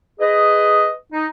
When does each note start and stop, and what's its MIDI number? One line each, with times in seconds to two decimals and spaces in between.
0.20 0.91 68
0.20 0.91 71
0.20 0.91 75
1.13 1.26 63